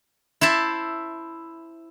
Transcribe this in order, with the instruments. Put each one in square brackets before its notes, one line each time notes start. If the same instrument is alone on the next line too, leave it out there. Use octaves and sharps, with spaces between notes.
[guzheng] E4 C5 E5 A5